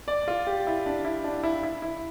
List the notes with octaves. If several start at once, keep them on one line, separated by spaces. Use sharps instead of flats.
D5
F4
G4
E4
D4
E4
D4
E4
E4
E4